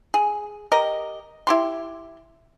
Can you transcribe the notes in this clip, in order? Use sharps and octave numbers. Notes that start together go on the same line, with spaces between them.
G#4
G4 A#4 D#5
E4 G4 C6